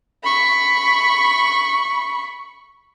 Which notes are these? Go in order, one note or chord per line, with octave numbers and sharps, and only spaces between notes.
B5 C#6